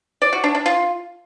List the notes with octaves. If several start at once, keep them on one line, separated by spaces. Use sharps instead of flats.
D5
F#4
D4
D4
F4